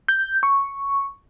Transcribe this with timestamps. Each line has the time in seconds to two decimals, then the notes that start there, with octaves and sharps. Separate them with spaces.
0.08 G6
0.43 C#6